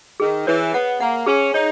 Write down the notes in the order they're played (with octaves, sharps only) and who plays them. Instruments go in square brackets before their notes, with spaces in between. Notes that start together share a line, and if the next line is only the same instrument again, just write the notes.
[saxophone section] D#3 [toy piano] G#4
[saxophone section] E3 [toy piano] C#5
[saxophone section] B3 [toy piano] F#5
[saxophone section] A#3 [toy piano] F#5
[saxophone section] C#4 [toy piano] G#4
[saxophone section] D#4 [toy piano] C#5